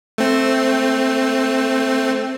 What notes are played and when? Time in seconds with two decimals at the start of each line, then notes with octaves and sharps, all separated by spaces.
0.18 A3 C4